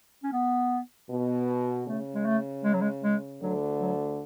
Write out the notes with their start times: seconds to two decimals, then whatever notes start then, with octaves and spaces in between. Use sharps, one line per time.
0.23 C#4
0.33 B3
1.10 B2
1.88 C#3 A3
2.14 G#3
2.26 A3
2.64 G#3
2.74 F#3
2.81 G#3
3.04 G#3
3.42 D2 D3 F#3
3.81 F#3